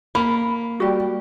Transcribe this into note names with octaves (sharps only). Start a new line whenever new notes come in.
A#3 B5
G3 F#4 G4